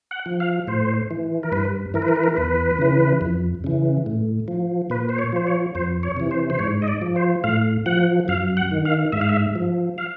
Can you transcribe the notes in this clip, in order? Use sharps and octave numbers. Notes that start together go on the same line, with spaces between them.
F#5
F3
F5
A2 C5
E3
A#4
G2 B4
E3 A#4
B4
A#4
B4
A#4
E2 B4
C#3 E3
F2
C#3 E3
A2
F3
A#2 B4
C5
C#5
F3 C5
C#5
F2 C5
C#5
C3 E3
C5
C5
G#2 C#5
D#5
D5
F3
C5
A2 F5
F3 F#5
F#2 F5
F#5
D#3
F5
G#2 E5
F5
E5
F3
F5